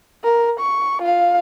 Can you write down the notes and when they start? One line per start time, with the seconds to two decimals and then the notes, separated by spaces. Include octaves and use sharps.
0.24 A#4
0.60 C#6
1.02 F4 F5